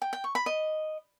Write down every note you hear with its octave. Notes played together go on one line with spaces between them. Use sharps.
G5
G5
C#6
B5
D#5